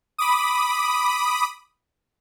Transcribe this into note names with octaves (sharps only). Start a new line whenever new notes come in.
B5 D6 D#6